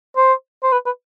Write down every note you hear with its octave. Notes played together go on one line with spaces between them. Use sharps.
C5
C5
B4
B4